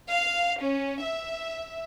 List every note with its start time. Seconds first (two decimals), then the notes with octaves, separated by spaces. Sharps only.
0.11 F5
0.62 C#4
1.03 E5